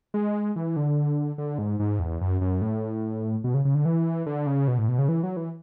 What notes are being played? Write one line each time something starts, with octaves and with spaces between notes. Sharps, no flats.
G#3
E3
D3
D3
G#2
G#2
E2
F#2
F#2
A2
B2
C#3
C#3
D3
E3
D3
C#3
B2
A2
B2
C#3
E3
F#3
E3